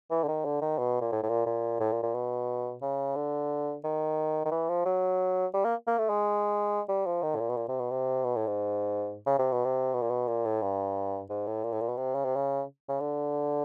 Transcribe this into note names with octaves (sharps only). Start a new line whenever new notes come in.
E3
D3
D#3
D3
D#3
B2
A#2
A2
A2
A#2
A#2
A2
A#2
A#2
B2
C#3
D3
D#3
D#3
E3
F3
F#3
G3
A#3
A#3
A3
G#3
G3
F3
D#3
A2
A#2
B2
A#2
C3
B2
C3
B2
A2
G#2
C#3
C3
B2
C3
B2
A#2
B2
A#2
A2
G2
G#2
A2
A#2
A2
A#2
B2
C3
C#3
C3
C#3
C#3
D3